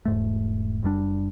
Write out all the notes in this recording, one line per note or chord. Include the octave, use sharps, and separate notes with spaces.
E1 G#2 A3
F#1 F#2 G3 D4